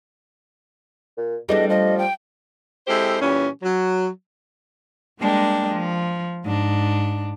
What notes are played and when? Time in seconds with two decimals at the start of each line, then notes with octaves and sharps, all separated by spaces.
1.17 A#2
1.49 E2 G3 A3 D4 D#5
1.69 F3 D#5
1.98 G5
2.87 G#3 C4 E4 G4 A4 C5
3.20 A#2 E3 G3 C#4
3.62 F#3
5.20 G3 G#3 A#3 D4 G4
5.73 F3
6.43 G#2 D4